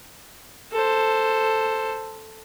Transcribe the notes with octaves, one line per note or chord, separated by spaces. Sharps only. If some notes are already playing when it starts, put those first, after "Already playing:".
A4 C5